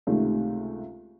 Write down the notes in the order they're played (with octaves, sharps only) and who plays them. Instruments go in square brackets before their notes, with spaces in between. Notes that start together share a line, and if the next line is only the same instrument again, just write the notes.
[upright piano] C#2 C3 D#3 A3